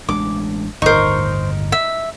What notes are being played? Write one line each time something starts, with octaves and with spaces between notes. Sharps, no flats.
A1 G#3 D4 D6
G1 D#2 A2 D#4 A#4 C5 C#6
E5